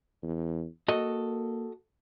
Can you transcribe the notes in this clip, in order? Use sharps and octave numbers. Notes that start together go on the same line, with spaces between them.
E2
A#3 F#4 A4 D#5